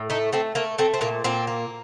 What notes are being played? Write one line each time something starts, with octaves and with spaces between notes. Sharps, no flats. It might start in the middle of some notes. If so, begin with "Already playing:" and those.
Already playing: A2
A3 D#4
A3 C4
A3 A#3
A3 C4
C4
A#2 A#3
A#2 C4
A#3